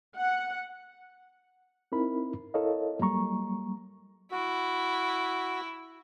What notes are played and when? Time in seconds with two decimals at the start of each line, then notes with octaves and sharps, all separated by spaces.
0.17 F#5
1.92 C4 D#4 E4 A#4 B5
2.54 E4 A4 A#4 C#5 D#5 F5
3.00 F#3 G3 A#3 A#5 C#6
4.31 E4 F#4